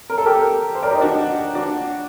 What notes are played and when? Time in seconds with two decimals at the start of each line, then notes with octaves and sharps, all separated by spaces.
0.10 A#4
0.18 A4
0.26 G4 A#4
0.75 C5
0.83 A#4 D5
0.91 D#4 G4
1.01 D4 F#4
1.55 D4 F#4